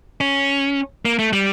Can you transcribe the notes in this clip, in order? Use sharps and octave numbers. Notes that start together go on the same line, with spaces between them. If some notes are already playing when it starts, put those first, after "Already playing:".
C#4
A#3
A3
G3